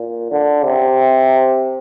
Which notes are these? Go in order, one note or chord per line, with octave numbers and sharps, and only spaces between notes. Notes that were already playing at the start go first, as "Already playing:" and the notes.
Already playing: A#2
D3
C3